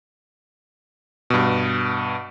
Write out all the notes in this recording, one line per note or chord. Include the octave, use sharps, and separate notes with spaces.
G2 B2